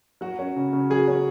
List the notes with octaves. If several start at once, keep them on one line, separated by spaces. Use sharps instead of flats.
F#3 F#4
C#4
C#3
C#3
F#3 G#4
C#4